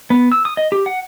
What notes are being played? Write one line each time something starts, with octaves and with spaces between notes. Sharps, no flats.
B3
E6
D#6
D#5
G4
F#5